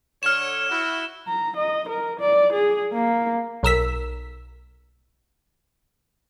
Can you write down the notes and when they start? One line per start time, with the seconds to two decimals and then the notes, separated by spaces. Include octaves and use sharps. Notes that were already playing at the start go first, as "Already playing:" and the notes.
0.23 D3 C#5 F6 E7
0.70 E4 F#4
1.27 A#5
1.57 D#5
1.89 A#4
2.20 D5
2.53 G#4
2.93 A#3
3.63 B1 A#4 E6 B6